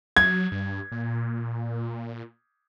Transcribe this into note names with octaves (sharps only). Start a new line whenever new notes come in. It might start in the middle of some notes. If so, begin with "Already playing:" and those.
F#3 G#6
G2
A#2